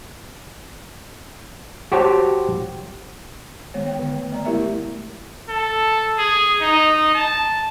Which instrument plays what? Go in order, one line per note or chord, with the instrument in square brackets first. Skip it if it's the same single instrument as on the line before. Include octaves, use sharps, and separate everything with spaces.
[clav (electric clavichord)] F#4 G4 C5 C#5 A5
[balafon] D#3 G#3 B3 C#5
B3 C#5 G5
D3
A3
G3 B3 D5 A#5
G#3 A3 E4 G4 A#4 E5
[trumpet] A4
G#4
D#4
A5